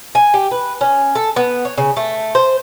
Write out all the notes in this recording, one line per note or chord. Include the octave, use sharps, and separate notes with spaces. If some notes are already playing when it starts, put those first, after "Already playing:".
G#5
G4
B4
C#4
A4
B3
C#5
C#3
A3
C5